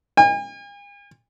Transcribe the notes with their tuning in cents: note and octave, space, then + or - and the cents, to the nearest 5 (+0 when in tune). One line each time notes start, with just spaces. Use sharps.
G#5 -45